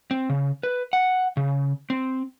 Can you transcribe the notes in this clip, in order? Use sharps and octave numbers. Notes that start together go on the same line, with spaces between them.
C4
C#3
B4
F#5
C#3
C4